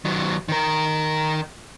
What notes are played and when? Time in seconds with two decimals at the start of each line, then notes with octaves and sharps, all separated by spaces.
0.05 D#3 F#3
0.49 D#3 A#4